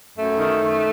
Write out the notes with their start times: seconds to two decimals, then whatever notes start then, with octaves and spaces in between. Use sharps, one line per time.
0.16 F#2 A3
0.39 D#3
0.63 D#3